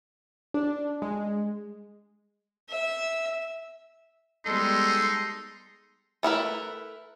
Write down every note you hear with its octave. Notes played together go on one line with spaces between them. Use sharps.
D4
G#3
E5
G3 G#3 B3 D#4 A4 C6
A3 E4 A#4 B4